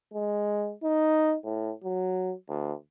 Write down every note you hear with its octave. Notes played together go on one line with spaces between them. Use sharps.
G#3
D#4
A2
F#3
D2